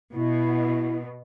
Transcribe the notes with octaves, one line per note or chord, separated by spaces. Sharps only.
B2 E4